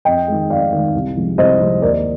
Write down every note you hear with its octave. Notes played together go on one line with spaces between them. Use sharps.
F2 D#5 G5
D#3 G#3
F2 D5 F5
D#3 G#3
C2
C3 F3 G#3
C2 C5 D#5
C3 F3 G#3
D#2 A#4 D5